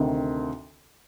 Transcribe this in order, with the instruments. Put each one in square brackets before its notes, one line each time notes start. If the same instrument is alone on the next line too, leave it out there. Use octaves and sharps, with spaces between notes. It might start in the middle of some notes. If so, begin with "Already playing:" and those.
Already playing: [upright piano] D2 C3 D#3